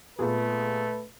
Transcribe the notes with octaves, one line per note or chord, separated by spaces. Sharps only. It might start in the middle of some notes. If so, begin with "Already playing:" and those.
A#2 A3 B3 G#4 B4